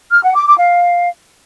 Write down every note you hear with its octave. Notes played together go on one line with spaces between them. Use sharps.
F6
F#5
D6
D6
F5